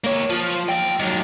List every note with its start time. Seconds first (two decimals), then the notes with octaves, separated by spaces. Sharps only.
0.04 A#3 C#5
0.30 F3
0.69 A#3 G5
0.99 D#3 F#3